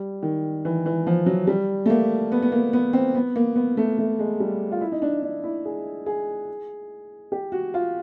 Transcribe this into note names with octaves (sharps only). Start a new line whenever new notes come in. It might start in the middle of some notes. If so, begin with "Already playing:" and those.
Already playing: G3
D#3
E3
E3
F3
F#3
G3
A3
A#3
B3
B3
A#3
B3
C4
B3
A#3
B3
A3
A3
G#3
G3
F4
E4
D#4
D4
D4
E4
G#4
G#4
G4
F#4
F4